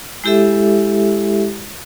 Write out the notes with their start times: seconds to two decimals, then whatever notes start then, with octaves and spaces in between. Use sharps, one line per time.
0.24 G#3 E4 G4 A4 E5